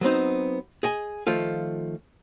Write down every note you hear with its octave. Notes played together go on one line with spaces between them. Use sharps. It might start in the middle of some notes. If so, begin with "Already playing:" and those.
F#3 B3 C4 D#4
G#4 D#5 G#5
D#3 F3 A3 F4